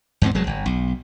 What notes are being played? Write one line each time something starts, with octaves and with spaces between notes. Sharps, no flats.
E2 G#2 C4
E1 F#3 G#3
G1
B1